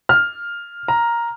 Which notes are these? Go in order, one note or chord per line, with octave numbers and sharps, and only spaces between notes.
F6
A#5